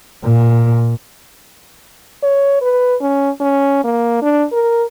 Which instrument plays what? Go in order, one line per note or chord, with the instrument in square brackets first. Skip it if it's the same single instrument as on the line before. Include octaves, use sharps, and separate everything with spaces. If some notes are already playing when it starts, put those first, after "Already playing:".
[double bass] A#2
[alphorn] C#5
B4
C#4
C#4
A#3
D4
A#4